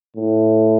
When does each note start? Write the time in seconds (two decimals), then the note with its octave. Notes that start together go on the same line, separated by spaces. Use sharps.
0.17 A2